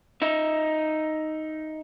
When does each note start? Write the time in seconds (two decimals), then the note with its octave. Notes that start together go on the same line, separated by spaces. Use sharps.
0.22 D#4 E5